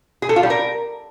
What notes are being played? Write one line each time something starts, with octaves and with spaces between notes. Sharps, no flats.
G#4
A4
F4
G3
A#4